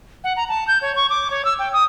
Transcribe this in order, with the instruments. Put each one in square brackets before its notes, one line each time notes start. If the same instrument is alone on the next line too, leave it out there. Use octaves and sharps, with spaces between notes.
[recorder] F#5
A#5
A5
G6
C#5
C#6
D6
C#5
E6
G5
D#6